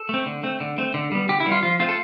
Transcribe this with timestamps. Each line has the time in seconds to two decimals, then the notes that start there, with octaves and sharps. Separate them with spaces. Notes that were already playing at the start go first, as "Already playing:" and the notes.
Already playing: A4
0.09 A3 C4
0.26 D3
0.43 A3 C4
0.61 D3
0.78 A3 C4
0.94 D3
1.12 G3 B3
1.29 D3 G4
1.40 E4
1.46 G3 B3
1.52 F4
1.63 F3 F4
1.79 A3 C4 F4
1.89 A4